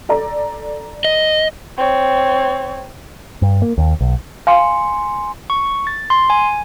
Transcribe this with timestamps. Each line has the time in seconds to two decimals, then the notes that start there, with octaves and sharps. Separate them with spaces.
0.09 A4 D5 A#5
1.05 D#5
1.77 C4 C#5
3.42 G2
3.62 A#3
3.78 D#2
4.01 B1
4.47 F5 G#5 C6 C#7
5.50 C#6
5.87 A6
6.10 C6
6.30 G#5